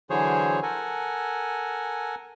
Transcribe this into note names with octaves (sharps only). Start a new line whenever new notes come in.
D3 E3 F#3 G#4 C5 C#5
A4 A#4 F#5 G#5